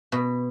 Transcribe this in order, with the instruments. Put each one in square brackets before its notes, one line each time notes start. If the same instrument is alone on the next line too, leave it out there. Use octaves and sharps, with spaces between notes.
[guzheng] B2